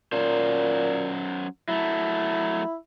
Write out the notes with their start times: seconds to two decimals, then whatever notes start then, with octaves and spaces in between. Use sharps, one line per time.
0.12 A#2 F#3 C#4 C5
1.69 F#3 A3 E4